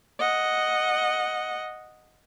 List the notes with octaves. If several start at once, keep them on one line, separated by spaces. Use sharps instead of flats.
D#5 F#5